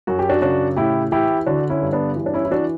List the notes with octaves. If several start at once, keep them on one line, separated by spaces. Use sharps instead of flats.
F#2 F#4
G4
D4 F#4
C#3 D4 F#4
A2 E4 G4
E3 E4 G4
D3 D4 F#4
C#4 E4
G2
B3 D4
E3
D4
C#4 E4
E4
E3 D4 F#4